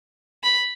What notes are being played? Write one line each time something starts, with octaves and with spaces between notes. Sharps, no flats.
B5